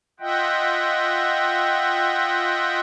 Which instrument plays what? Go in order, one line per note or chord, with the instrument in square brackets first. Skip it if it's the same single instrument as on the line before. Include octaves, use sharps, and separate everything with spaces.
[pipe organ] F4 D#5 E5 F#5 G5